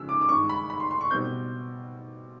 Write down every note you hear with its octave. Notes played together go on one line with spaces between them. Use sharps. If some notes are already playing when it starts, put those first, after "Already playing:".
Already playing: C#3 F3 G#3 E6
D6
D6
G2 D#3 G#3 C#6
B5
B5
C6
C6
C#6
B2 G3 C4 G6